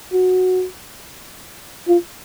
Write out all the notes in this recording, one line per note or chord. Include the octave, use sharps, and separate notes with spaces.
F#4
F4